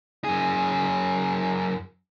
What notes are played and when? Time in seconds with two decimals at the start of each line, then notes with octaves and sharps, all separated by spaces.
0.24 F#2 G#4